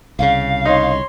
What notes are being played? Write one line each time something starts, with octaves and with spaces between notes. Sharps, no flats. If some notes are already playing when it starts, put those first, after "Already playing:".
C2 C#3 F5
D#4 C#5 C6